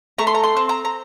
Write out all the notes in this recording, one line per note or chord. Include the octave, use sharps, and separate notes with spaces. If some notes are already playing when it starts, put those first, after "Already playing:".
A3 A#5
C6
A#5
C6
C4
A#5
A#5